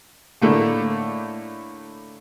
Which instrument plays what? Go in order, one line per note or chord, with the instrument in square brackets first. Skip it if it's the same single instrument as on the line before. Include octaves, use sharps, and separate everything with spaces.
[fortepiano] A2 D3 A3 A#3